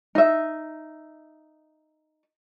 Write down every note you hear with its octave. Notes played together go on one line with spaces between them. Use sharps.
D#4 E5